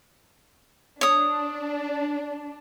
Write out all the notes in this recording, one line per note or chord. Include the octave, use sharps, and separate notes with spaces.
D4 C#5 D#6